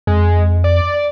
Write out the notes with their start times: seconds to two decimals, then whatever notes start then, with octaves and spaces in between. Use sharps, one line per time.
0.07 F2 G#3
0.64 D5